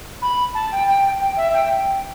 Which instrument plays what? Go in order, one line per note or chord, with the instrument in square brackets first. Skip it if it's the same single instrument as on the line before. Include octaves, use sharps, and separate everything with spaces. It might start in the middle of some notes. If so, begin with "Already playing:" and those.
[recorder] B5
A5
G5
G5
G5
E5
G5